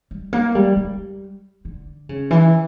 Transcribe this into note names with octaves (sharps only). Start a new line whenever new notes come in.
G3
A#3
G3
G3
D3
C#3
E3